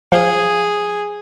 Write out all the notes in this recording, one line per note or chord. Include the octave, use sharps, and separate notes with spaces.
F3 G#4 F5